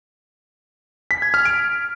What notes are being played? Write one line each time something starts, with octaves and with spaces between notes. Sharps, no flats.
B6
G#6
F6
D7